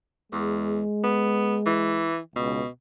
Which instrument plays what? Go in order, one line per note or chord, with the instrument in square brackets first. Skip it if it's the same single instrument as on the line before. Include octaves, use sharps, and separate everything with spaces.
[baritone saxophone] E2 [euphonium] G#3
[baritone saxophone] B3
E3
[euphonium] C#2 [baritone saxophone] B2